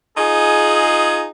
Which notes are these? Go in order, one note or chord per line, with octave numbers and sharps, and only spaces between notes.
D#4 F4 G#4